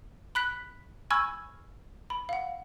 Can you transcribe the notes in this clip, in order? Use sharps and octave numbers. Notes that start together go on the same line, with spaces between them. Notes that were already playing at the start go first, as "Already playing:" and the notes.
B5 F#6 B6
G#5 B5 C#6 E6 F6 G#6
B5
F5 F#5